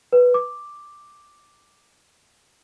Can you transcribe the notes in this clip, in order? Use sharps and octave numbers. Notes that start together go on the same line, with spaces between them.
B4
D6